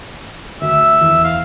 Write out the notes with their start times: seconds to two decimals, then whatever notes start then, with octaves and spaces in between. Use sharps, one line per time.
0.61 D2 E5
1.01 E2
1.25 F5